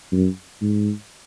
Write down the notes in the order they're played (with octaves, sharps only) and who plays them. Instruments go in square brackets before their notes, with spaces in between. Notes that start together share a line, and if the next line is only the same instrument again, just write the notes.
[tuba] F#2
G#2